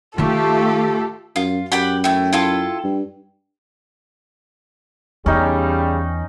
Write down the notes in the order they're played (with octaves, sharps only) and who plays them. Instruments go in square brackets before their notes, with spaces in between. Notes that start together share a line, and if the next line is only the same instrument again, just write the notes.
[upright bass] D#3 D#4 [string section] A3 [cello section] F4 G4 [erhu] A4
[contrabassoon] F#2 [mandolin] F4
[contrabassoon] F#2 [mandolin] G4 F#5 B5
[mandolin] A3 E4 [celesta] G5
[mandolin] E4 F4 A4
[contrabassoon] G2
[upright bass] E2 [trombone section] C#3 G3 [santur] C#4 D#4